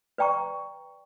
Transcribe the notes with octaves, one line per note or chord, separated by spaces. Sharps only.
B4 D5 G5 A#5 C#6